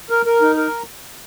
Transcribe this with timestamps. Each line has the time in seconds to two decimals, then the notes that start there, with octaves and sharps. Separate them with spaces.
0.10 A#4
0.26 A#4
0.41 D#4
0.57 A#4